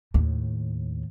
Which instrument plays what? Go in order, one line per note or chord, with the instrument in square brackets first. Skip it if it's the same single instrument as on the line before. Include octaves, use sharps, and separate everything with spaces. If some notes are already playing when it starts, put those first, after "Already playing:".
[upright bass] D#2 A2